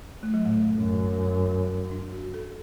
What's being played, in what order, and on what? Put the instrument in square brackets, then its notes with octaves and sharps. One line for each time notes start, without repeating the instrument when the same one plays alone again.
[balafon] A3
F#3
[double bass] A2 [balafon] A3
[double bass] F#2
[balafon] D4
F#4
A4